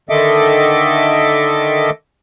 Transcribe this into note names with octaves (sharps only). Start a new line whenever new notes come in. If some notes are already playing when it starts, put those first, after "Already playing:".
D3 D#3 A4 D#5 E5 D6